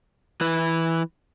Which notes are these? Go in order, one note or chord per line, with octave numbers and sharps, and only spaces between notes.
E3 B4